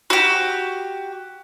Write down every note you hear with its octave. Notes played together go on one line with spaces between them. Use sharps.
F#4 G4